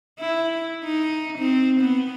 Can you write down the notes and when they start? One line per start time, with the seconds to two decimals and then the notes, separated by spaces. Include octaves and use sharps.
0.20 E4
0.85 D#4
1.38 C4
1.80 B3